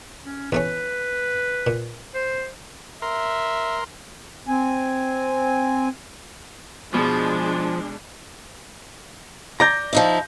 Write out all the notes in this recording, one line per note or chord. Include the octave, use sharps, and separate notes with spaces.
C#4
E2 A3 C#4 B4
A#2
C5
A#4 E5 C6
C4 G#5
B2 F3 G#3 D4
D5 A#5 G6 A#6
F3 D#4 E4